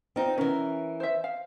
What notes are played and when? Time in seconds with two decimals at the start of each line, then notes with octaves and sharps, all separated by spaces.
0.16 C4 D#4 F4
0.38 E3 C#4 A#4
1.00 C5 E5
1.24 F5